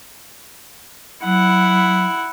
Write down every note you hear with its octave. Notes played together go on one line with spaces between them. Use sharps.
F#3 E4 F#5